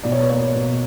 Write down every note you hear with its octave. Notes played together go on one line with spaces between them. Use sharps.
B2 D5
C#5
B4
A#3 C#5
D5
B2